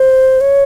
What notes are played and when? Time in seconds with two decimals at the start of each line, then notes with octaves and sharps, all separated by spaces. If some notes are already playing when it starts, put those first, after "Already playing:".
Already playing: C5
0.41 C#5